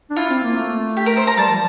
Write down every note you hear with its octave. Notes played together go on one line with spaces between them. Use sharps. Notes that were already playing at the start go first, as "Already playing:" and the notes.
D4
E4 F4
C4
A#3
A3
G4
A#4
C5
A#5
G3 A5
F3